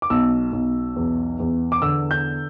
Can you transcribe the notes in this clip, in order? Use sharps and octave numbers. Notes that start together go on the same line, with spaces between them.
D6
B1 E6
B1
E2
E2
D6
D3 E6
G6